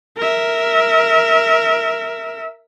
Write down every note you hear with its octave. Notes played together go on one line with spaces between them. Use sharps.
A#4 E5